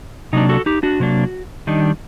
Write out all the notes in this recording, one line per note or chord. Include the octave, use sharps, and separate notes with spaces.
C3 F#3 A#3 D4 D#4
F#4 A4
D#4 G4
D4 F#4
C3 F#3 A#3 D4
D#3 G3 D4 D#4